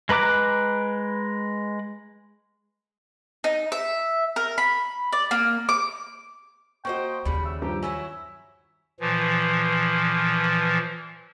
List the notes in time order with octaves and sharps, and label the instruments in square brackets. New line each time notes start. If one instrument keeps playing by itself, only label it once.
[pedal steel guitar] G#3 B4 A#5 D6 F#6
[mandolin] D#4
E5
A#4
B5
D5
A#3
D6
[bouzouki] A#3 C5 D#5 [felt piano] F#4 C#6 [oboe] G5
[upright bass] D#2 [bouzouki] C#3 G3 [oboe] B5
[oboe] E5
[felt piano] G2 F3 A#5 [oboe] G4
[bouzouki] F#3 E4 C#5 [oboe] E5 [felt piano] G#5
[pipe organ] A#2 E3 F3